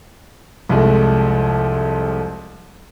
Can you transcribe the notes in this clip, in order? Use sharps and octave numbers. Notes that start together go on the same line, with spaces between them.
C2 F2 G#3 A3